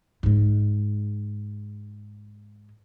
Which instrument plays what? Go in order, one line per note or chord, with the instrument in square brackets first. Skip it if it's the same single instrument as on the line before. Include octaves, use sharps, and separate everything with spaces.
[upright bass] G#2 G#3